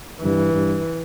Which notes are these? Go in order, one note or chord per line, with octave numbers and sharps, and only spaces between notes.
G2 E3
G2